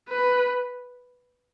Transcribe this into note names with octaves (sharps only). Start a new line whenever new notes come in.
B4